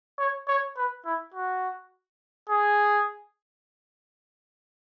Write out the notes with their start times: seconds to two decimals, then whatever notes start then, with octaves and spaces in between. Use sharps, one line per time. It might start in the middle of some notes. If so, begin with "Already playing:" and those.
0.19 C#5
0.48 C#5
0.77 B4
1.05 E4
1.34 F#4
2.50 G#4